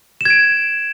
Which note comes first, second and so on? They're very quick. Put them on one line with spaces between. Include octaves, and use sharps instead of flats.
E7 G#6 D7